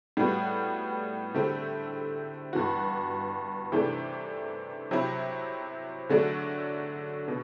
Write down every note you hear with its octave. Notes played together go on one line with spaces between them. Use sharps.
A2 G3 B3 F#4
D3 A3 C4 E4 G4
G2 E3 B3 F#4
C3 E3 A3 D4
C3 F#3 C4 E4
D3 F#3 A3 D4 F#4
B2